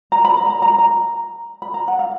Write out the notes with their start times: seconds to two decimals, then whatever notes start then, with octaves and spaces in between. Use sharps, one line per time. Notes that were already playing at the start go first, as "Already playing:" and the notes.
0.12 A#5
0.25 B5
0.37 A#5
0.50 A#5
0.62 A#5
0.70 B5
0.78 A#5
1.62 B5
1.74 A#5
1.88 F#5
1.99 F5